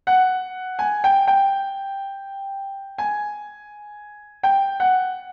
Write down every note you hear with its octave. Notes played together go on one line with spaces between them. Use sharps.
F#5
G#5
G5
G5
G#5
G5
F#5